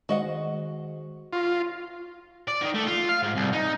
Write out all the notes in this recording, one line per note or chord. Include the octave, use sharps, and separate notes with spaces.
D#3 G#3 F#4 C5 D#5 F#5
F4 C6 C#6 A#6
D5
D#3
A3
F4
F5
G#2
C2
D#4